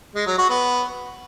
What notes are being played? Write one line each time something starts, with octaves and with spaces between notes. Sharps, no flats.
G#3
F#3
F#4
B3